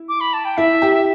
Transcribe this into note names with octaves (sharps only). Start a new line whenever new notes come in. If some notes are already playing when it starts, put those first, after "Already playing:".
Already playing: E4
D6
B5
A5
G5
E4 E5
G4